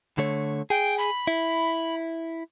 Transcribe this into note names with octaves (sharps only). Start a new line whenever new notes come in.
D3 A3 C#5
G#4 G5
B5
E4